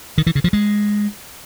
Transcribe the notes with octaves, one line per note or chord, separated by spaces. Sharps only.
D#3
E3
C#3
F3
G#3